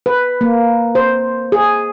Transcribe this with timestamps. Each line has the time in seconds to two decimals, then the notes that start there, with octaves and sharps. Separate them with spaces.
0.06 B4
0.41 A#3
0.95 C5
1.52 G#4